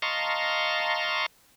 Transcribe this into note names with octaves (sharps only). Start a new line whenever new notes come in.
D#5 F5 A5 A#5 C6 C#6